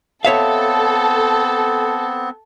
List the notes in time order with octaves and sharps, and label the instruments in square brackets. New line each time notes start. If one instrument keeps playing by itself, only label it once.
[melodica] B3 C4 [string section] A4 [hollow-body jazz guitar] C#5 E5 F5